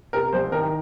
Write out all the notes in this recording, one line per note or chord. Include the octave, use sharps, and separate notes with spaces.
C3 A#4
C2 C5
D#3 A#4